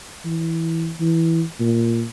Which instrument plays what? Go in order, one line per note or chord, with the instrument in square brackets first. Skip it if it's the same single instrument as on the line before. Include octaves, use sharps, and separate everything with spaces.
[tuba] E3
E3
A#2